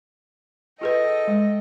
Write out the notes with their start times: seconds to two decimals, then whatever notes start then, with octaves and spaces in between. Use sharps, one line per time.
0.81 F4 G#4 A4 B4 D#5 G5
1.27 G#3